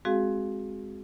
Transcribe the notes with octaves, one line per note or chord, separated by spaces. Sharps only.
G#3 C4 F#4 G#4 F5